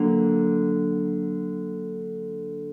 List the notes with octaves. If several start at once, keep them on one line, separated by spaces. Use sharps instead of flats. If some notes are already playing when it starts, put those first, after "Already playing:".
Already playing: D3 F#3 A#3